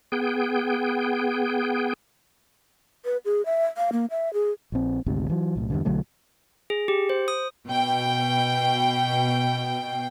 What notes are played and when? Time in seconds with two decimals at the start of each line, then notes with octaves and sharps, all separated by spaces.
0.12 B3 G#4 G5
3.05 B4
3.25 G#4
3.46 E5
3.77 F5
3.92 A#3
4.10 E5
4.34 G#4
4.72 A#1 C4
5.06 G#1 D2 G#2 C3
5.30 E3 F#3
5.56 B1 A2
5.70 E2 G2 D3
5.85 B1 D3 F#3 A3
6.70 G#4
6.88 G4
7.09 C5
7.28 D#6
7.67 B2 G5